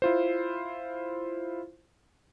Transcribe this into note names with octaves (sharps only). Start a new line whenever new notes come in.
E4 F4 C5